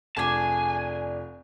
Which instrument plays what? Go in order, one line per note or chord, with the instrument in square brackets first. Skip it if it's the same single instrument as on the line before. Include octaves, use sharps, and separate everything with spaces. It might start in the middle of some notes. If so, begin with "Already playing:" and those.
[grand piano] F1 [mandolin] D4 D5 [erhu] G#4 [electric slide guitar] G#5 A5